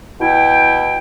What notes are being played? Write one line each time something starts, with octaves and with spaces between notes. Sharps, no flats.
B2 E4 G5